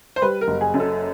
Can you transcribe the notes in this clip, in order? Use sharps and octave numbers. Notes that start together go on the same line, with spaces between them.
C5
G3 B4
A#4
F#1
G#4
F#2
A4